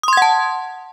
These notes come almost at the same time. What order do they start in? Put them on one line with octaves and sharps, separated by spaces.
D#6 C6 G#6 F#5 A5